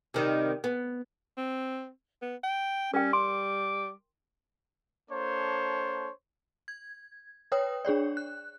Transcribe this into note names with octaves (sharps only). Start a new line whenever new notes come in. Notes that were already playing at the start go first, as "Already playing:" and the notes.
C3 D#3 G3
B3
C4
B3
G5
G3 C#4 A#4 G5
C6 D6
A#3 D4 A4 C5 C#5
G#6
B4 C#5 G5 D#6
D4 G#4 C#5 D5
F#6